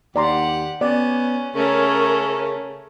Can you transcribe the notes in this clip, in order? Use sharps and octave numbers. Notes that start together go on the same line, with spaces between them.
D#2 G4 D5 F#5 A#5 C6
B3 C#4 D5
C#3 A3 C#4 A#4 C#5